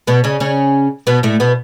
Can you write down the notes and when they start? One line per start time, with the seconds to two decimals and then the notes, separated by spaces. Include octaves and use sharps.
0.07 B2 B3
0.24 C#3 C#4
0.40 C#3 C#4
1.07 B2 B3
1.23 A2 A3
1.40 B2 B3